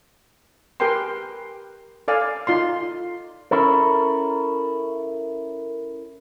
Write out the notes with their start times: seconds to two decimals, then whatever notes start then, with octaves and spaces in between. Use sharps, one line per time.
0.80 G4 A#4 B4 G5 G#5 C6
2.08 A4 D5 F5 G#5
2.47 D#4 F4 D5 C6
3.51 C#4 E4 A4 A#4